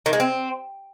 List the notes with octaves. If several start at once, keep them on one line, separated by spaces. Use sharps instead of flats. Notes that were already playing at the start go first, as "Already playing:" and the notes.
D#3
G#3
C4